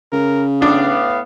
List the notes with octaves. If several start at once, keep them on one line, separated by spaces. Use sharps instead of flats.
C#3 A#4
A2 B3 D4 F5